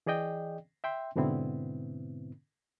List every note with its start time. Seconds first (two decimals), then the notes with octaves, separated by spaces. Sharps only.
0.06 E3 G#4 D5 D#5 G5
0.84 E5 G5 C6
1.16 G#2 B2 D3 B3 C4 E4